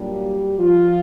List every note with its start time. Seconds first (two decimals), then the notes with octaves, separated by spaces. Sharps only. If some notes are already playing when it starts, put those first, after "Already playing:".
Already playing: A#2 F#3 G3 A#3 D4 G4
0.59 F3 F4